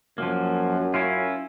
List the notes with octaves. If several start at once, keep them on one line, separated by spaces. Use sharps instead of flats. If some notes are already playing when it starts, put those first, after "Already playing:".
F#2 F3 F#3 A#3
C#4 E4 F4